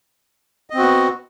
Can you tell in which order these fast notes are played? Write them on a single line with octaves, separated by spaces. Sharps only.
D#5 C4 F#4 B3